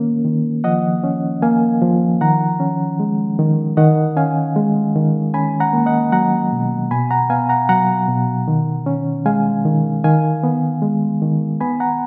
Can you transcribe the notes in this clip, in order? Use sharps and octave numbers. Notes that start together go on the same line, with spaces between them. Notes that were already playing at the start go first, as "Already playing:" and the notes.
Already playing: D#3 A#3 C#4
D#3
F3 D#5 F#5
C#4
A#3 F5 G#5
F3
D#3 F#5 A#5
C#4
G#3
D#3
D#3 D#5 F#5
C#4 F5 G#5
G#3
D#3
C#4 G#5 B5
F#5 A#5
A#3
D#5 F#5
F#3 F#5 A#5
B2
B2 G#5 B5
F#5 A#5
B3 F5 G#5
F#5 A#5
F#3 F#5 A#5
B2
D#3
C#4
G#3 F5 G#5
D#3
D#3 F5 G#5
B3
G#3
D#3
B3 G#5 B5
F#5 A#5